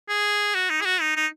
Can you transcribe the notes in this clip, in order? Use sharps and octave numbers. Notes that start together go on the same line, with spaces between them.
G#4
F#4
D#4
G#4
F#4
D#4
D#4